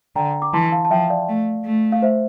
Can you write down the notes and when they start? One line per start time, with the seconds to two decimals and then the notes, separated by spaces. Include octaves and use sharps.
0.16 D3 G5 A#5
0.42 D6
0.54 E3 A5 C6
0.72 F5 A5
0.85 A5
0.91 F3 E5 G5
1.10 D5 F5
1.29 A3
1.65 A3
1.92 F5
2.02 C5 E5